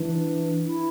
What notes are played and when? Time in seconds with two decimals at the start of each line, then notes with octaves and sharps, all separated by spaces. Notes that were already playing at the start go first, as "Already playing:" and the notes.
Already playing: E3 D4
0.66 E4